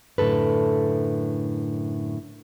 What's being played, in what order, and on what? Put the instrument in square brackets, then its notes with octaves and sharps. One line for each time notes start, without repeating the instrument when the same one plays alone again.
[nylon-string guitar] F#2 A2 D3 A4 B4